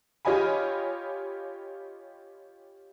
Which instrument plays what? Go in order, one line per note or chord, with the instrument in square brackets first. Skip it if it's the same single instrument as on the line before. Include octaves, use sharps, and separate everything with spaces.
[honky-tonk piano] F4 G4 C#5 D#5 G#5 B5